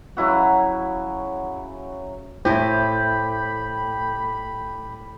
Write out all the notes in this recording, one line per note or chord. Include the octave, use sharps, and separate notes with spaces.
C#3 F#3 E4 F#4
A2 E4 G4 C5 D#5 B5